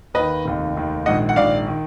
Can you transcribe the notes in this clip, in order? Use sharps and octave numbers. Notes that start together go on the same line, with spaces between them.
D#2 D#3 B4 D#5
F1 D#2 D#3
F1 D#2 D#3
A#1 G#2 D#3 D#5 F#5
F#5
A#1 G#2 D#3 D5 F5
D#3